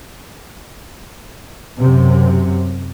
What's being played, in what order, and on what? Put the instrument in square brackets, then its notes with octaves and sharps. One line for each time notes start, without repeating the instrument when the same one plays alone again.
[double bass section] F#2 C3